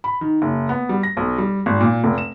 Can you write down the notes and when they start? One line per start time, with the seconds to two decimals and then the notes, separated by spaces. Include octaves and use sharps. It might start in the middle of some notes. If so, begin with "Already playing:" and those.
0.04 B5
0.21 D#3
0.42 F#1
0.69 B3
0.89 G3
1.03 A#6
1.17 B1
1.38 G3
1.66 G#1
1.81 A#2
2.04 F1
2.18 E7